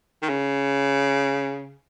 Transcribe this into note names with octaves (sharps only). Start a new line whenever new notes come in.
D#3
C#3